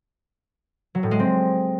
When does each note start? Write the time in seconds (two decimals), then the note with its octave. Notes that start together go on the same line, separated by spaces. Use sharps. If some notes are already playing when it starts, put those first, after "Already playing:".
0.95 F#3
1.03 A2
1.11 G#3
1.20 C4